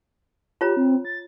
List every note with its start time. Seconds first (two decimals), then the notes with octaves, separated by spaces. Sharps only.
0.61 F4 G4 C#5 A#5
0.77 C4
1.05 A6